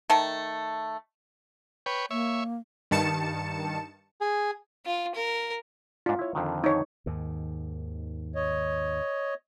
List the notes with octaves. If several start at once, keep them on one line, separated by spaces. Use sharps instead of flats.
D#3 A3 A5
B4 C#5 G5
A#3 C#5 E5
G2 D#3 A5 C#7 E7
G#4
F4
A#4
G#2 D4 F4
E4 C#5
F2 D3 D#3
D#4 C#5
D#2 G#2 D#3
C#5 D#5